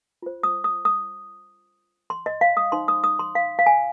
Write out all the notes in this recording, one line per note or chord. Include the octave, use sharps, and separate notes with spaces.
F4 C5
D#6
D#6
D#6
C6
D#5
F5
D#6
D#4 C5 C6
D#6
D#6
C6
F5
F5
G#5